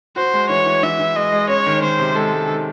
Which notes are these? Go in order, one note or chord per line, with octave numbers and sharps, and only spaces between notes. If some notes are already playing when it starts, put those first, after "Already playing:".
F#4 C5
G#3
E3 C#5
E3
E3 E5
E3
G#3 D#5
G#3
C#4 C#5
D#3
D#3 C5
C3
G#3 A4
G#3
D#3